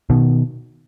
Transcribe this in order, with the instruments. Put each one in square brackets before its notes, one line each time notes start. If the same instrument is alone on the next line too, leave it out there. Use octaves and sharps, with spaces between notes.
[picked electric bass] B2 D#3